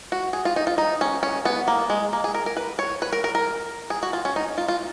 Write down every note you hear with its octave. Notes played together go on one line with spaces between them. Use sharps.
F#4
G#4
F4
D#4
F4
D#4
C#4
C#4
B3
A#3
G#3
A#3
G#4
A#4
A#4
B4
C#5
B4
A#4
A#4
A#4
G#4
F#4
F4
C#4
D#4
F4
F4